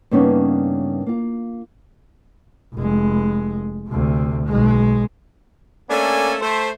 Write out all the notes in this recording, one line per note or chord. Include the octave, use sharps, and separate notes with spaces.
G2 C#3 A#3 B3 C#4 D#4
A#3 F4
F1 G#3
D2 C3
B1 G#3
A3 A#3 C#4 D4 A4 G#5
A3 C5